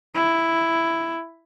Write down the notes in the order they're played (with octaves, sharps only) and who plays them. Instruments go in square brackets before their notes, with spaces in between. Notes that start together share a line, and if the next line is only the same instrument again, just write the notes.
[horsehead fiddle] E4